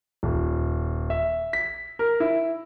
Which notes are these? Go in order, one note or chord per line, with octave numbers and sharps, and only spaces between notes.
D#1
E5
B6
A#4
E4